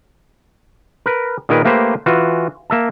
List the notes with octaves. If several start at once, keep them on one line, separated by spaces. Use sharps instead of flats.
A#4 B4
A#2 D#3 G#4 A#4 B4
A3 A#3 G4 B4 C5
E3 F4 F#4
A#3 E5 A5